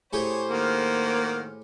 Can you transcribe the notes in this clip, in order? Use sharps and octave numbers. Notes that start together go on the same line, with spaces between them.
A2 G4 G#4 C5 C#5
D#3 A#3 F#4 F6